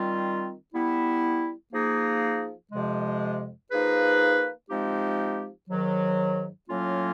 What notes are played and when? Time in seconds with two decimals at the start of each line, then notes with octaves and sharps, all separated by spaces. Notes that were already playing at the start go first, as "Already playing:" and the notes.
Already playing: D#3 G3 C4 F4
0.73 G3 B3 E4
1.72 F3 A#3 D#4 G#4
2.72 F2 C3 F3 G#3
3.70 F3 A#3 D#4 G#4 B4
4.69 F3 G#3 C4 D#4 G4
5.69 G#2 D#3 F#3
6.68 A2 F#3 A#3 C#4 F4